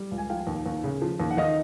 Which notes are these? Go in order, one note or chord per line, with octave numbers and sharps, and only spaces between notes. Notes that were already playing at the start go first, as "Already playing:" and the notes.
Already playing: G3
C#2
G#5
F3 F5 G5
D#2
D#2
C#3
F3
D#2
F#5
D#3 D#5 F5